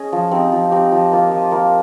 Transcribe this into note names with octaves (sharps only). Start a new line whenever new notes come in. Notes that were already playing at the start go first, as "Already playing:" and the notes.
Already playing: C#4 G#4 D#5
F3
C4 D#4 G4
F3
C4 D#4 G4
F3
A#3 F4
F3
A#3 F4